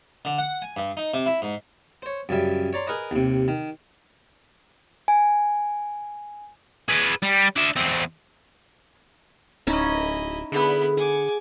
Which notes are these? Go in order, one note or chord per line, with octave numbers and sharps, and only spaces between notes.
D3
F#5
G#5
G2
D#4
C3
E4
G#2
C5 C#5
F#2 C#3 G3 E5
C#5 D5 A#5 C6
G#4 A#4 B4 D#5
D#2 C3
D#3
G#5
G#4 B4
G3
D4 E5
E2 C4
D1 C#4 D#4 E4 D#5
D3 B3 E4 G#4
F#5 G#5 D6